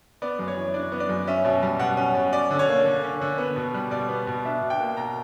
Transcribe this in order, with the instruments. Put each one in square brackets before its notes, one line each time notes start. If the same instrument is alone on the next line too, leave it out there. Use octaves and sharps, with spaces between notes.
[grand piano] B3 D5
F#2
C#5
E3
D4 D5
B3
D5
F#2
C#4 E5
B2
G3
B2 F#5
C#4
B2
C#4 D5
D3
C#5
A#3
D3
C#4
D3
B3
B2
G3
B2 D5
B3
B2
D4 E5
B2
G5
A#3
B2 A#5